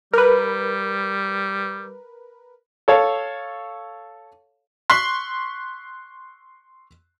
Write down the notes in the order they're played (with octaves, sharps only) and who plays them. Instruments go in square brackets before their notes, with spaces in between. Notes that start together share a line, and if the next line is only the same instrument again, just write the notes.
[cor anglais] G3 [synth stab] A#4 B4
[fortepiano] A4 C#5 F5
[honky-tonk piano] C6 C#6 F#6 B6 C7